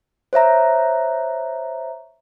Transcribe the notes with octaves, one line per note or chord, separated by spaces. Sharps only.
C5 C#5 E5 A#5